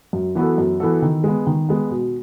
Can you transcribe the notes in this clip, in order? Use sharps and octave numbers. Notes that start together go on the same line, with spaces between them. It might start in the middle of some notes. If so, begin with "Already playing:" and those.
F#2
E3 B3 F#4 A4
F#2
E3 B3 F#4 A4
D#3
G#3 B3
D#3
G#3 B3
B2